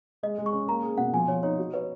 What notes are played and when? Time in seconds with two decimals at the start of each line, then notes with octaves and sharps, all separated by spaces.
0.23 G#3 D#5
0.38 G#3
0.46 C#6
0.53 C#4
0.68 A#3 A#5
0.83 G#4
0.98 B2 F#5
1.13 F3 G#5
1.28 F3 C#5
1.43 D#4 C#5
1.58 F#4
1.73 B4 C#5